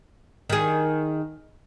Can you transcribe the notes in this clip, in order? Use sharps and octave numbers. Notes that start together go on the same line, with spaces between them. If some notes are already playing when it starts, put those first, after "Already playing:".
D#3 G#4